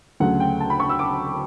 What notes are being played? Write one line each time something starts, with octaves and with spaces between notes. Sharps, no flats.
D2 C#3 F#3 A3 F#5
G5
A5
B5
C#6
E6
D6